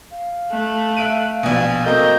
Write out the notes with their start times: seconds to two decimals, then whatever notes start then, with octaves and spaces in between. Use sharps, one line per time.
0.12 F5
0.51 A3 F#6
0.97 E5 D7 D#7
1.43 A#1 B2 G#5
1.86 A3 A#3 C4 F#4 D#5 G6